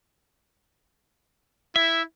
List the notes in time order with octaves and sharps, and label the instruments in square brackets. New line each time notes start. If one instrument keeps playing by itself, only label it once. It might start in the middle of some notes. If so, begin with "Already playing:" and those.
[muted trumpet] E4 [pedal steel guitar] E5